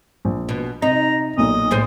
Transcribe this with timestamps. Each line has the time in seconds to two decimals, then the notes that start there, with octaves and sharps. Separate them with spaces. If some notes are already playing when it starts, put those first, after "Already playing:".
0.25 A#1
0.49 B2
0.82 C3 D#4 A#5
1.38 B1 A#2 D#5
1.71 A2 G#3 C5